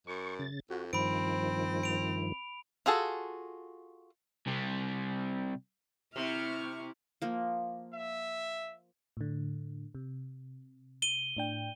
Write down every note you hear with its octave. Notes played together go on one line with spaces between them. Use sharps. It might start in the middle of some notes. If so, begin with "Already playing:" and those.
F#2 C#6
C#3 A6
F2 F#4
G2 D#3 F3 C4 B5 D7
D7 F7
F4 F#4 G#4 A4
C3 G3
C3 C4 E4 C#6 F6
F3 A#3
E5
A2 D3
C3
D#7 G7
A2 D4 G5